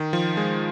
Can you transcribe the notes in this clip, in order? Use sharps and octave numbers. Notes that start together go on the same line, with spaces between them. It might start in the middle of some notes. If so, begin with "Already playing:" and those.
Already playing: D#3
F3
G#3